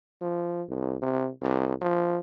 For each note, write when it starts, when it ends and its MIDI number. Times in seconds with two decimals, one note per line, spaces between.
0.21 0.62 53
0.69 0.95 36
1.02 1.28 48
1.42 1.73 36
1.81 2.18 53